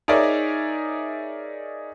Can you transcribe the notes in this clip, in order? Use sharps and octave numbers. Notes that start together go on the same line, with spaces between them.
D#4 G#4 A#4 C#5 D5 E5